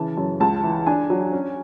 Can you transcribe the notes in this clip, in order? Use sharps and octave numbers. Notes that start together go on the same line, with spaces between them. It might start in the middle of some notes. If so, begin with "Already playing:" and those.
Already playing: C#3 E3 A5
F#2
C#2 A5
E3
D4 G#5
F#3
C#4